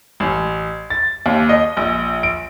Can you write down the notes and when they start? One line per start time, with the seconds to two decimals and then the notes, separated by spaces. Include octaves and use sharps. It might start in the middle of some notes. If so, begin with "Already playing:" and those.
0.20 A1
0.90 A6
1.26 D#2
1.49 D#5
1.77 A#1
2.23 D7